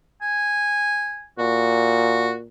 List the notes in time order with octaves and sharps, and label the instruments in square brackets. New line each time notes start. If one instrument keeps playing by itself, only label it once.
[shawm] G#5
[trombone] A#2 [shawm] F#4